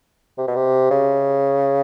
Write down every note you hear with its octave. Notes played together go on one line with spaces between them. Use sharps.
C3
B2
C3
C#3